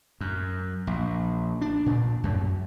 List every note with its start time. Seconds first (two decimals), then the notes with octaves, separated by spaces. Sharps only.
0.21 F#2
0.87 A#1
1.61 D4
1.86 A#2
2.24 F#2